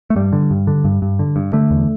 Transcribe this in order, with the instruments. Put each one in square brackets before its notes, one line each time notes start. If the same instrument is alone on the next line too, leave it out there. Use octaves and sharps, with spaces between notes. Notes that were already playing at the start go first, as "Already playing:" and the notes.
[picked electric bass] A3
G2 G3
D3
G2
D3
G2
G2
D3
G2
D3 A3
E2